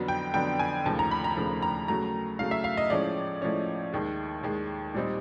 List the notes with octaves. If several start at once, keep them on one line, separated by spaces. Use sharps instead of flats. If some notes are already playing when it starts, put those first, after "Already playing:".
Already playing: F2 D3 F#3 B3
G5
F2 D3 F#3 B3 G5
G#5
D#2 C#3 F3 A3 A5
A#5
B5
A#5
D#2 C#3 F3 A3
A#5
C#3 F#3 A3 A#5
C#3 F#3 A3 F5
E5
F5
D#5
A2 F3 G#3 C#4 D5
A2 F3 G#3 C#4
D#2 D#3 G#3
D#2 D#3 G#3
A#2 G3 C4 D#4